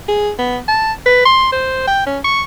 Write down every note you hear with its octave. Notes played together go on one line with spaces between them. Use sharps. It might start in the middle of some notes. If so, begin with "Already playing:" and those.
G#4
B3
A5
B4
C6
C5
G5
C#4
C#6